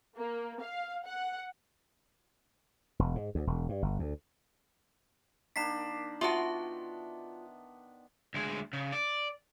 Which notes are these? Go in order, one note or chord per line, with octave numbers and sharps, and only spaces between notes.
A#3
F5
F#5
E1
G#2
D2
E1
G2
G1
D2
D#3 A#3 D4 B6 C7 E7
B3 F4 F#4 E5 F#5 A5 C6
D2 G#3
C#3
D5